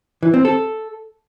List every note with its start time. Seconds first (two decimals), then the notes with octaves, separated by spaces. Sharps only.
0.23 E3
0.34 C4
0.45 A4